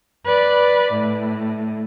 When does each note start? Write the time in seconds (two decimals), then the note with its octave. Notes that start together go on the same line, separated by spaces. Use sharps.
0.23 B4 D5
0.91 A2